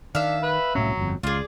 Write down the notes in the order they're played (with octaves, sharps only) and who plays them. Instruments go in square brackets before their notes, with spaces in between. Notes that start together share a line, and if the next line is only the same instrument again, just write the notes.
[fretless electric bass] D#3 [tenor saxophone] D4 [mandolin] E5 F5
[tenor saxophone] B4
[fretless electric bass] C2 A2 C#4 [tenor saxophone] F#3
[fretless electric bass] G1 F2
[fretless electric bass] C#2 [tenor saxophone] F4 [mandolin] G#4 D5